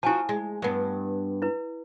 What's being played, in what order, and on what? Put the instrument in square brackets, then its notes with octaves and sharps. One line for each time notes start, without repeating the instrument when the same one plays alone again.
[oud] F3 F#4 [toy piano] E4 G#5 A5
[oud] G#3
G2 B3
[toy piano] E4 B4